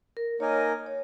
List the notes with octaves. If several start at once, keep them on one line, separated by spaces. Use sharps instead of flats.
A#4
A#3 D#4 A#4 C#5 D#5 G#5
C#5